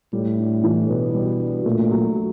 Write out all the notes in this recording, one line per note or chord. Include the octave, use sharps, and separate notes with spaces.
A2 G3
D4
E3
B2 B3
G3
D4
A#2 A3
F#3
F#3